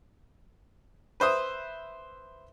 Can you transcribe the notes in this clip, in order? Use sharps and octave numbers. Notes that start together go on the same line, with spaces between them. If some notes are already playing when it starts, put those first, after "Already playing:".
B4 C5 E5 D#6